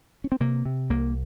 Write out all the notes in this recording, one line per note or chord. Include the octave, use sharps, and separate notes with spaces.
C#4
C4
C3 A#3
C3
C2 A#3